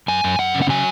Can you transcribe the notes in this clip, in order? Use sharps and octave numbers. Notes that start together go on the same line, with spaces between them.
F#2 G#5
F#2
F#2 F#5
C#3
F#5
F#3 G#5